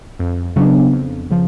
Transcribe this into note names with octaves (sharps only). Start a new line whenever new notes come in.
F2
C#3 F#3 B3 D4
F2
C#3 F3